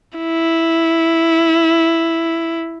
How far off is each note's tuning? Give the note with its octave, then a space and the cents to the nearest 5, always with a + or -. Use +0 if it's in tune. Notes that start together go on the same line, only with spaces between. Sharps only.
E4 +0